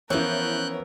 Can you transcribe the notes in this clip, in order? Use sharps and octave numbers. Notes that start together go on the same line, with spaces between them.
E3 F3 B3 C#4 E4 A#4 F#6 G6